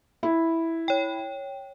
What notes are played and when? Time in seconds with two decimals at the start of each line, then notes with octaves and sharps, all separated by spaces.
0.23 E4
0.88 C#5 G5